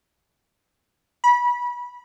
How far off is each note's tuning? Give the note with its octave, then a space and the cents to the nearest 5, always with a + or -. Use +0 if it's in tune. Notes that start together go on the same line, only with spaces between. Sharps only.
B5 -25